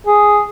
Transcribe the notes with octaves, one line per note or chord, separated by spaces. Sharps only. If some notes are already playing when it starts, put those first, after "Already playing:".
G#4